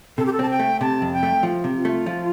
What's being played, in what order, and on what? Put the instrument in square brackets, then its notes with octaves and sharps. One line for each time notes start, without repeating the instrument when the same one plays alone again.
[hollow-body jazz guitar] C3 [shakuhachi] A4
[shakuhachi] G4
A4
[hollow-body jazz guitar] C4 [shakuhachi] A5
[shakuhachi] G5
[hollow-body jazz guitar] A3
[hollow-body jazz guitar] C3 [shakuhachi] A5
[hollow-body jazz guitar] F2
[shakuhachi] G5
[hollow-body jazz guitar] A3
F3
C3
[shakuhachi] F4
[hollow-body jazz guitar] A3
F3